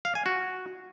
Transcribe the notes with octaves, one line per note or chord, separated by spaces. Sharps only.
F5
G#5
F#4